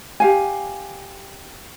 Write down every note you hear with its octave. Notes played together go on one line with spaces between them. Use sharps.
G4 F5 G#5